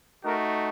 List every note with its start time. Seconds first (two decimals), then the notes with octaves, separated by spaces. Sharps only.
0.24 A3 D#4 F#4 A#4